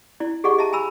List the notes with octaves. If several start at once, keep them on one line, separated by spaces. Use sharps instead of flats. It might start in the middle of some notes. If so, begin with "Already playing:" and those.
E4 D5
G4 G#4 D5 D#5 F#5 C#6
D#5 E5 A5 A#5
G#5 A#5 B5 E6